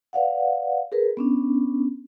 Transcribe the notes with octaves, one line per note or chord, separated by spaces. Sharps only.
B4 D5 F5 F#5
G#4 A#4 B4
B3 C#4 D4